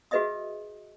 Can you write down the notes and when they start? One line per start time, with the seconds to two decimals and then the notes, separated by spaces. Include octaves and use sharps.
0.11 F#4 G#4 B4 D#5 E5 D#6